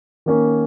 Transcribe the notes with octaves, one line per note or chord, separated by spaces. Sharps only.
D#3 A#3 C#4